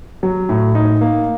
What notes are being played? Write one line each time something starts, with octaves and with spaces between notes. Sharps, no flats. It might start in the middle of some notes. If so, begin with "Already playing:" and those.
F#3
A2
D#4
A#3